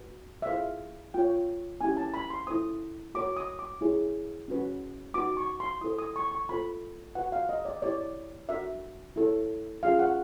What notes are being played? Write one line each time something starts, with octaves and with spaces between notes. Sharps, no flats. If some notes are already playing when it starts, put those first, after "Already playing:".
Already playing: F#4 B4
E5
E4 G#4 C5 F5
F4 A#4 C#5 G5
C#4 E4 G4 G#5
A5
B5
C6
E4 A4 C5 D#6
F#4 A#4 C#5 D6
D#6
D6
E4 G#4 C#5
C#4 F#4 B4
D#4 F#4 B4 D6
C#6
C6
E4 A4 C5 D#6
D#6
C#6
C#6
F4 A4 C5 B5
F#4 B4 F#5
F5
D#5
D5
E4 G4 A#4 C#5 D5
D4 F#4 A#4 E5
E4 A4 C#5
C#4 F4 G#4 F5
F#5